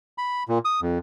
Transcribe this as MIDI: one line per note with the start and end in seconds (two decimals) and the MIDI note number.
0.18 0.43 83
0.48 0.58 46
0.65 0.80 87
0.82 0.98 41